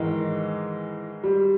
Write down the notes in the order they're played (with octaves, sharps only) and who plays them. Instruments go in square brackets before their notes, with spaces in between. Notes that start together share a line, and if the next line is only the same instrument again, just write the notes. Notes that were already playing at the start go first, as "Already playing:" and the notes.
Already playing: [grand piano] G#2 D#3 G#3 D#4 A#4 [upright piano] E3
[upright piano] G3